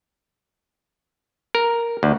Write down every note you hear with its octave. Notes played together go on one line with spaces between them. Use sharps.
A#4
D2